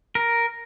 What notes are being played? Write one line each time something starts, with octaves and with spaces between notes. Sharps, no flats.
A#4